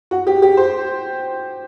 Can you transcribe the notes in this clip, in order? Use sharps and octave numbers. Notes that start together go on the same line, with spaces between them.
F#4
G4
G4
C5